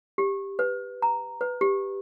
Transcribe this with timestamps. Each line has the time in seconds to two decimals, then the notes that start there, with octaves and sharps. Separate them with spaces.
0.18 G4
0.59 B4
1.02 A#5
1.41 B4
1.61 G4